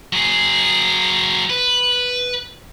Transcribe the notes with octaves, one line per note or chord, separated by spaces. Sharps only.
F#3 G#4
B4